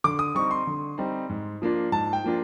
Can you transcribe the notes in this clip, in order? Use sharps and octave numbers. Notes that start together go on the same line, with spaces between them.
D3 D6
D#6
G3 C4 D#4 C#6
C6
D3
G3 C4 D#4
G#2
F3 A#3 D4 F4
G#2 A5
G5
F3 A#3 D4 F4